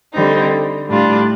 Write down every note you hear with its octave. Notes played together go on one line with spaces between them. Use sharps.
D3 G3 C4 D#4
A2 G3 D4 F4